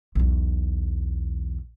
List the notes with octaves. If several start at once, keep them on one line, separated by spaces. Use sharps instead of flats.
B1 E2